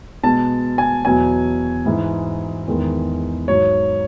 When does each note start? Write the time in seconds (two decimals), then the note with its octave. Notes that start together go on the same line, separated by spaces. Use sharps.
0.23 B2 G#3 A5
0.78 G#5
1.05 E2 B2 F#3 G#5
1.86 G#2 E3 G#3
2.68 E2 D#3 G#3
3.48 G#2 F#3 C#5